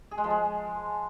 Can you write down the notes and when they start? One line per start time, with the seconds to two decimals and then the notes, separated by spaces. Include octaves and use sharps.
0.11 G#4
0.18 G#3
0.24 F3
0.30 G#3